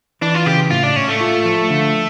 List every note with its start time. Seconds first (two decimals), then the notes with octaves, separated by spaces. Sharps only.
0.21 E3 D4
0.34 F4
0.46 C#3 G4
0.71 A2 F4
0.83 D4
0.96 A2 C#4
1.08 A3
1.21 F4
1.45 F3
1.70 D3